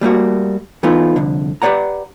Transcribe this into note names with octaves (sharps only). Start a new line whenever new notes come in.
G3 A3 A#3 F#4
E3 A3 B3 D#4 F4
C2 F2 D3
G4 B4 C5 D5 F#5 A#5